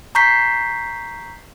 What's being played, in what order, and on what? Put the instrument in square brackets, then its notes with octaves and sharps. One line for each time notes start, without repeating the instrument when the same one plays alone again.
[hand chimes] A#5 C#6 G6 B6 C7